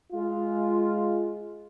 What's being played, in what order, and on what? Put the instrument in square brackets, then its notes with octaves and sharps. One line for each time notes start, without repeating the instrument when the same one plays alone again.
[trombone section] G#3 F4